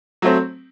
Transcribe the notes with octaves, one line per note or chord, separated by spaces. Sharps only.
F#3 A3 C4